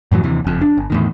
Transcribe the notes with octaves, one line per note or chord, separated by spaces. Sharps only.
F#2 A2 E3 F#3
D#2 C3 E3
F#1 F2
D4
G1
E2 A2 D#3